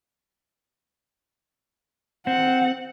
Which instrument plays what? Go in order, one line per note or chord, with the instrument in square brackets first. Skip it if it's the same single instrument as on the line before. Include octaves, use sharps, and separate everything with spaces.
[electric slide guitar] C4 [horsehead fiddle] F#5